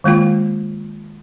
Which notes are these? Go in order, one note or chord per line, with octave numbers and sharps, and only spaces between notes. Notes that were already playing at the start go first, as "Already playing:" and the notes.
D#3 G#3 A#3 F4